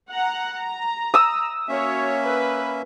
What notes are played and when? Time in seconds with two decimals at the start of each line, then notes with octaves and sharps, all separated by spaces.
0.11 F#5 A#5
0.56 A#5
1.14 D#6 E6
1.68 A#3 C#4 F#4 C#5 E5
2.24 B4